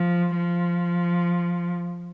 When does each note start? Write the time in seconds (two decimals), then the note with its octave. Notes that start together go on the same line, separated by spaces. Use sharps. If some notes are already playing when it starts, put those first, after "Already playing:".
Already playing: F3
0.37 F3